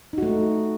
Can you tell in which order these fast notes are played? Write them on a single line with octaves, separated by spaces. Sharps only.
D#4 F#4 A3